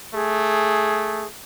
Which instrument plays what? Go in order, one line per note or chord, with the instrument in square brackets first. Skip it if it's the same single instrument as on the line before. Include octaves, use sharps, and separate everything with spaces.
[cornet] A3 [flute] G#4